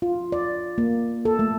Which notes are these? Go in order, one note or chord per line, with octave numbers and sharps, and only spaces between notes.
F4
D5
A#3
A4
A3